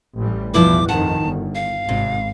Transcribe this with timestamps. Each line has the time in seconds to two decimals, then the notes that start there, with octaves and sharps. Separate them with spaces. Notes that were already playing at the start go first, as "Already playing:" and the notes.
0.18 A1 E3 G3
0.54 E2 G2 B2 F3 E4 B4 D6
0.89 F2 D#3 F#5 A5
1.24 G1
1.55 F5
1.89 G#1 C3